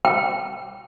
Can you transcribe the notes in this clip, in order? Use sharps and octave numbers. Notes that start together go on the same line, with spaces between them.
G5